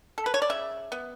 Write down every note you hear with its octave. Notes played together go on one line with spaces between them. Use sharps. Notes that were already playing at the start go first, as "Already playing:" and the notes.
A4
B4
C#5
D5
C#3 E5
B3